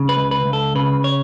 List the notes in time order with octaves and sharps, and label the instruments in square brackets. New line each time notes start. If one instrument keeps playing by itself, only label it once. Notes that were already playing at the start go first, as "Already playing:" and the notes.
Already playing: [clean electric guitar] C#3
B4
C#2
B4
C#2
A4
C#3 B4
C#5